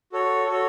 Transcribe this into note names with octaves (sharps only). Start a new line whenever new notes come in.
F#4 A4 C#5
F#4 A4 C#5